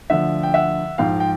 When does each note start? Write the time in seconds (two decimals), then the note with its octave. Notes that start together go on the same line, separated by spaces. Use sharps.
0.10 D2 D3 F3 E5 F#5
0.43 G5
0.54 E5 F#5
0.98 G#2 F3 F5 G5
1.20 G5